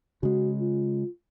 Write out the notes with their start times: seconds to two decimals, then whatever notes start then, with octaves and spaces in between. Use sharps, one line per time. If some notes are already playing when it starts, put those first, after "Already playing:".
0.23 C#3 G#3 F#4
0.60 F4